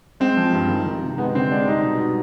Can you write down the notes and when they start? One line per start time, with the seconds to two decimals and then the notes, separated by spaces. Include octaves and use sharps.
0.20 G#3 C4
0.37 F3
0.53 G2
0.69 D#3
0.86 D#3
1.03 C3
1.18 G#3 B3
1.34 D3 C4
1.51 G#3 D4
1.67 G3 D#4
1.84 B2
2.01 G3